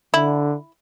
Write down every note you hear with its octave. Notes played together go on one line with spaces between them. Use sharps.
D3 E4